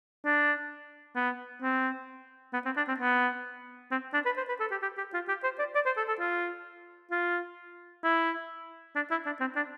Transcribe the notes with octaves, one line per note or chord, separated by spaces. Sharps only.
D4
B3
C4
B3
C4
D4
C4
B3
C4
D4
B4
C5
B4
A4
G4
G4
G4
F4
G4
C5
D5
D5
C5
A4
A4
F4
F4
E4
D4
E4
D4
C4
D4